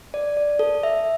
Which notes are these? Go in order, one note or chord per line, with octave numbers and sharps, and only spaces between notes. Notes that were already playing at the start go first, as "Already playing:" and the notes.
D5
D5
A4
E5